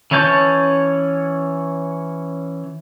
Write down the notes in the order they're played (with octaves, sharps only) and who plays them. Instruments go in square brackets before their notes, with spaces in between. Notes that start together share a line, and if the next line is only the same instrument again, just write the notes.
[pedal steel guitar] E3 C#4 C#5 A5 G6